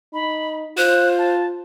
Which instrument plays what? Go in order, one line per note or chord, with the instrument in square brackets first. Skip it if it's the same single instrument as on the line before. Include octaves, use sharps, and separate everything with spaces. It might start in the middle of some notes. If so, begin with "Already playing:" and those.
[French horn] D#4 [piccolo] B5
[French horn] F4 [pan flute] C5 [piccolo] F#6
[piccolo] A5